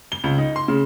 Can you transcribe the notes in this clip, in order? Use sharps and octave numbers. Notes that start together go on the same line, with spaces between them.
G7
C#2
D#4
C6
C#3